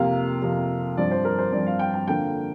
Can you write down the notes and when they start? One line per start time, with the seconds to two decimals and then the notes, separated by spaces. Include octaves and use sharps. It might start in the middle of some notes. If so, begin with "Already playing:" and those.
Already playing: F2 C3 A#3 F5
0.42 F2 C3 A#3
0.97 G2 F3 C4 D5
1.11 C5
1.25 A#4
1.38 C5
1.52 G2 F3 C4 D5
1.66 F5
1.79 G5
1.94 G5
2.07 F2 D3 A#3 G5